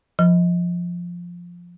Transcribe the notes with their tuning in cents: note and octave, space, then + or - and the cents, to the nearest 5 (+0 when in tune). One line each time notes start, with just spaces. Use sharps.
F3 +0